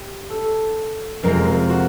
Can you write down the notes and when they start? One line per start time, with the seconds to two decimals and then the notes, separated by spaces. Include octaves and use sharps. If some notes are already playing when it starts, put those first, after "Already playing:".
Already playing: G4
0.30 A4
1.23 F2 C3 F3 G#3 A#4
1.47 A#4
1.70 F#4